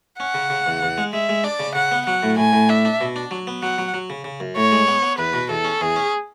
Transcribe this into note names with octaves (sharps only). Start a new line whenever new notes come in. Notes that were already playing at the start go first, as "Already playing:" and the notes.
C#4 F#5
C#3
C#3
E2
E2
G#3
G#3 E5
G#3
D4 D5
C#3
C#3 F#5
B3
F#3 F#5
A2
A2 G#5
A2
D4 E5
D4
B2
D4
F#3
B3
F#3 F#5
F#3
F#3
C#3
C#3
F#2
A2 C#5
G#3
B3
B3
E2 B4
B2
E2 A4
C#4
E2 G#4
C#4